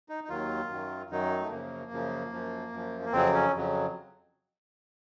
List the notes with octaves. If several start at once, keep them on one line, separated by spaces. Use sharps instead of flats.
D#4
D#4
D#2 D#3 F#3 F4
F#2 D#3 F#3
F#2 D#3 F#3 D#4
A3
F#2 C#3 F3 A#3
F#2 C#3 F3
F#2 F3
F#2 F3
A#3
F2 C#3 F#3 C4
C#4
F2 C#3 F#3